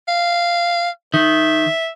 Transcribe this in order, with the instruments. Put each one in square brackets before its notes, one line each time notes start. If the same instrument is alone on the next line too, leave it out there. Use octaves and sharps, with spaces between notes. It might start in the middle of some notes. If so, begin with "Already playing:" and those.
[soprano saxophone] F5
[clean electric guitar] D#3 [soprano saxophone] E5